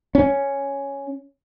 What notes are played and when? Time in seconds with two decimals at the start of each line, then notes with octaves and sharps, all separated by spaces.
0.15 C#4